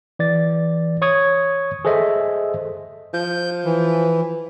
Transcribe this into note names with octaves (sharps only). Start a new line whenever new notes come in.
E3 D5 A6
C#5 C#6 D#6 G#6
G#4 A4 C5 D#5 E5
F3 G6
E3